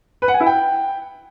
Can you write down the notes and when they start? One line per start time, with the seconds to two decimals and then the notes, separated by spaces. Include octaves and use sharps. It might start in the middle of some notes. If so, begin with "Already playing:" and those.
0.22 B4
0.28 F#5
0.34 G#5
0.40 E4
0.46 G5